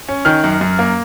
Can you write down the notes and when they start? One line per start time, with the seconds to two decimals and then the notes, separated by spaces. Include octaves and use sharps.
0.08 C#4
0.25 D#3 F6
0.44 F#2
0.61 F#2
0.79 A#3